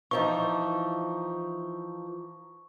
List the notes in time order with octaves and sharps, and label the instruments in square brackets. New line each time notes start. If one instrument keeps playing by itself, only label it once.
[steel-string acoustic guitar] E3 F3 D#4 [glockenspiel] C#6